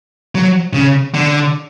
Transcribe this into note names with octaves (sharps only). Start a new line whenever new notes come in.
F#3
C#3
D3